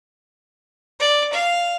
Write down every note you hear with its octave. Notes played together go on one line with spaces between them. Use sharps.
D5
F5